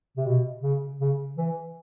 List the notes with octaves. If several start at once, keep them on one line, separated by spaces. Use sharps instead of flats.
C3
B2
C#3
C#3
E3